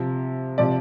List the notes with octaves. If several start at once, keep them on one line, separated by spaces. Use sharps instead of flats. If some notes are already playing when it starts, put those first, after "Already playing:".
Already playing: C3 F3
C3 F3 D5